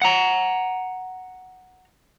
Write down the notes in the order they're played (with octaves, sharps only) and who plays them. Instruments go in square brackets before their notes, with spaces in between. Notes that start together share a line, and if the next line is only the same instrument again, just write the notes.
[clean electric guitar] F#5 A#5